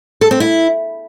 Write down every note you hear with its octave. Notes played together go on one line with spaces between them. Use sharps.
A4
C4
E4